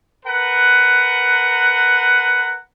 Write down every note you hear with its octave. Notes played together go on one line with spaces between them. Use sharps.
A#4 B4 F#5